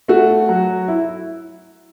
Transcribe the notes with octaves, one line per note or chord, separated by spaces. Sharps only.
A3 F#4
F#3
E4